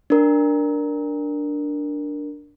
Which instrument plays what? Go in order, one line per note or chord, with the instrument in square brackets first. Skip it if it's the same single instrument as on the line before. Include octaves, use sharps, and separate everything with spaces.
[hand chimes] D4 A#4